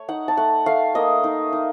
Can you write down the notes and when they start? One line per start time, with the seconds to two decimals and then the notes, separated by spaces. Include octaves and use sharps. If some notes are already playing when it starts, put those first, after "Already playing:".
Already playing: A3 C#5
0.08 D#4 F#5
0.28 A5
0.37 A3 F#5
0.66 A3 F5
0.95 A#3 D#5
1.24 D#4
1.53 D#4